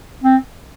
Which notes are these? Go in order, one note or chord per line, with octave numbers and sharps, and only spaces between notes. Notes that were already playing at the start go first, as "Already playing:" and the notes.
C4